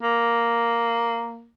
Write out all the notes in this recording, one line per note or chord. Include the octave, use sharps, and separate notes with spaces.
A#3